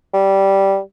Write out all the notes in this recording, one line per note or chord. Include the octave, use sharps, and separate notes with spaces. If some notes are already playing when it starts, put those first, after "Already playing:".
G3